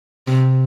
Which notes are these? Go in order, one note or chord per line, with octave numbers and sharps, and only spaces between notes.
C3